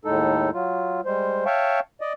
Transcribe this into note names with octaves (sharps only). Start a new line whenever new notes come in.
D#2 A2 G#3 D#4 A4
F#3 F4
G3 G#3 C5
C#5 E5 F5 G5 A5 C#6
D5 D#5